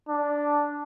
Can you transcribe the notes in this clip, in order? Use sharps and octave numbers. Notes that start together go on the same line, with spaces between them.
D4